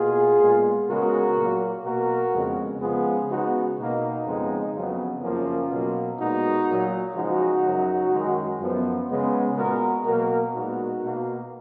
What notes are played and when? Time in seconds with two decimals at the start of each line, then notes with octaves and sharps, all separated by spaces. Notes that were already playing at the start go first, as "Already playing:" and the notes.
Already playing: B2 A#3 F4 G#4
0.40 A#2 G#3 B3
0.88 C#3 G#3 B3 F#4 A#4
1.37 A#2 F#3 A#3
1.84 B2 A#3 F#4 A#4
2.33 F2 C#3 G#3 B3
2.81 C#3 F3 G#3 B3 F4 G#4
3.29 C#3 G#3 B3 D#4 F#4
3.77 B2 A#3 D#4
4.26 F2 C#3 G#3 B3
4.75 F2 C#3 F#3 B3
5.22 F#2 C#3 F3 A#3 C#4 F4
5.70 B2 F#3 A#3
6.19 A#2 G#3 B3 D#4 F#4
6.67 A#2 F#3 A#3
7.15 C#3 F3 G#3 D#4 F#4
7.64 F#2 C#3 F#3
8.12 F#2 D#3 G#3
8.60 F#2 F3 B3
9.09 C#3 G#3 B3
9.57 A#2 G#3 B3 F#4 A#4
10.05 B2 F#3 A#3 F#4 A#4
10.54 A#2 G#3 B3 D#4 F#4
11.03 B2 A#3